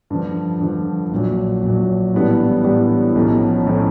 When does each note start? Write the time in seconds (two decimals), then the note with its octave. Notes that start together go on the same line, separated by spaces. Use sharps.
0.10 G2 D3 F3
0.60 G2 D3 F3
1.11 A#1 A#2 F#3
1.62 A#1 A#2 F#3
2.14 A2 E3 G3 B3 D4
2.64 A2 E3 G3 B3 D4
3.15 B1 A2 F3 A3 C#4
3.67 A2 F3 A3 C#4